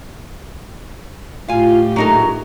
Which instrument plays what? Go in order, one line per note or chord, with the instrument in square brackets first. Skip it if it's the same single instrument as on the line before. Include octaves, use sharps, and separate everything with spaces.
[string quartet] A2 G4 [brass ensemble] F4 [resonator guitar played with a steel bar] F5 G#5
[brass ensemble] A#1 A3 [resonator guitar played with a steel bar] F#3 D#4 A#4